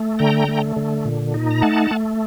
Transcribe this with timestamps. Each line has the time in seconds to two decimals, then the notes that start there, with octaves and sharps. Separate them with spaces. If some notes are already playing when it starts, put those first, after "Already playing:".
Already playing: A3
0.19 D3 G5 A#5
0.48 A3
0.76 D3
1.05 A#2
1.34 D#4
1.51 A#5
1.62 A3 F#5 A5
1.91 A3